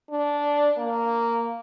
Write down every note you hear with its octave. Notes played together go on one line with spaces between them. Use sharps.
D4
A#3